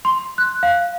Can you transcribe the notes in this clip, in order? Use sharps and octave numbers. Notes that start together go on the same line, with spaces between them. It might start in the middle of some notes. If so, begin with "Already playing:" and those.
C6
F#6
F5